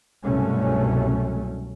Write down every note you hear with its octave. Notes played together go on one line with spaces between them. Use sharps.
C2 G2 B2 F#3 A3 C#4